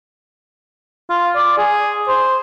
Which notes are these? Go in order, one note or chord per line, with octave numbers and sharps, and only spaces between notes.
F4
D5
G#4
C5